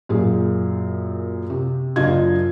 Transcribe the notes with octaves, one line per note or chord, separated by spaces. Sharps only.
F#2 A#2 G#4
C3
F#1 F#2 D4 F4 D#5 G#6